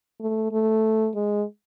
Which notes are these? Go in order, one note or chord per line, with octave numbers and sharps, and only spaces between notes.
A3
A3
G#3